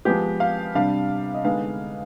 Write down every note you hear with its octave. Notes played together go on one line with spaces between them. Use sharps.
F3 G#3 B3 G4
F5
C3 G3 D4 F5
D#5
D3 G#3 B3 D#4 F5